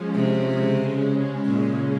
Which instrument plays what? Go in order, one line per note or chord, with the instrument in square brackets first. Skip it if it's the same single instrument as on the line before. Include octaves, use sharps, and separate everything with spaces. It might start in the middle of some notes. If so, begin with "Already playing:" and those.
Already playing: [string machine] F3 G#3 C#4
[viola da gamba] C3
[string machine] C#3 G#3 C#4
[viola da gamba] A#2